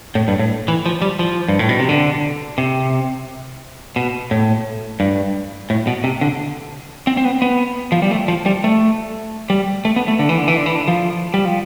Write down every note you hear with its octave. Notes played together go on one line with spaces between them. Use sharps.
A2
G2
A2
E3
F3
G3
F3
G2
A2
B2
C3
D3
C3
B2
A2
G2
A2
B2
C3
D3
C4
C4
B3
B3
F3
G3
A3
F3
G3
A3
G3
A3
B3
A3
D3
E3
D3
E3
D3
E3
D3
F3
G3
F3